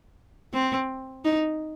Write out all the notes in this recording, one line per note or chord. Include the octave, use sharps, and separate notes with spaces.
C4
D#4